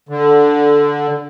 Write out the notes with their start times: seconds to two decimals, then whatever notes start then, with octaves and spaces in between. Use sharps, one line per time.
0.09 D3